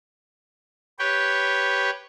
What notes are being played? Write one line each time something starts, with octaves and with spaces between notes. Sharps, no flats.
G4 B4 C#5 G5